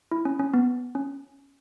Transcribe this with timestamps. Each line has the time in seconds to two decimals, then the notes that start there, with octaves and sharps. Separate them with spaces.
0.11 E4
0.25 C#4
0.39 C#4
0.54 B3
0.95 C#4